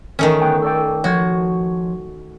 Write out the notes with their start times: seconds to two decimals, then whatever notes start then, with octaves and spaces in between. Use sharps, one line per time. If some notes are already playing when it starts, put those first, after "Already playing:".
0.19 D#3 E3 A3 C#4
0.41 D2 B3 G5
0.62 A4 D5 G5
1.04 F3 F#4 C#5